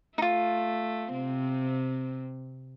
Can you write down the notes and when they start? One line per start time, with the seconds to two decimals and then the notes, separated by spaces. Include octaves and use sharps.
0.18 A3 D#4 F4
1.10 C3 C4